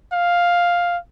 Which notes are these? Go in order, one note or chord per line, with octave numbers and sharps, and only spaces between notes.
F5